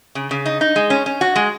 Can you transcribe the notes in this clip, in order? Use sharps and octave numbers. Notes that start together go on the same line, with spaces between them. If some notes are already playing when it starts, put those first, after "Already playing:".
C#3
C#3
D#4
D#4
G#3
C#4
C#4
F#4
G#3